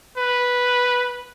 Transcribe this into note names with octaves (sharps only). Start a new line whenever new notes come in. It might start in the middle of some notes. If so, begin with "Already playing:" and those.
B4